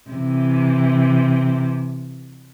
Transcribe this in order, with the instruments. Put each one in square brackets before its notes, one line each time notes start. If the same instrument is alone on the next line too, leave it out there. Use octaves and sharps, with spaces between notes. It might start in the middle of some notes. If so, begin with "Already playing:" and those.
[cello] C3 E3